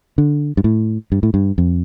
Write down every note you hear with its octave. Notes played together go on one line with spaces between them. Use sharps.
D3
G2
A2
G2
A2
G2
F2